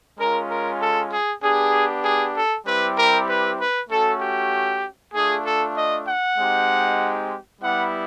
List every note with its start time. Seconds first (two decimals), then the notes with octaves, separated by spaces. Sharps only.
0.19 G#3 C#4 F4 A#4
0.49 A#4
0.81 A4
1.12 G#4
1.43 B3 D4 G4 G#4
2.04 G#4
2.35 A4
2.66 G3 C4 E4 G4 B4
2.98 A#4
3.28 B4
3.60 B4
3.90 A3 C#4 F#4 A4
4.21 G4
5.14 A3 D4 F4 G#4
5.45 A4
5.77 D#5
6.07 F#5
6.38 G#3 C4 D#4 G4
7.62 G3 B3 E4 G4 F#5